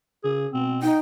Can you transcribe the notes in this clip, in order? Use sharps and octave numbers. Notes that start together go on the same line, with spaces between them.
C#3 G#4
B2 C4
D#4 G5